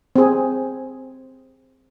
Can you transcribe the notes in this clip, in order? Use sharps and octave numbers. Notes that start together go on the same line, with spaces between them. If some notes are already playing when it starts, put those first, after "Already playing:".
C4 G#4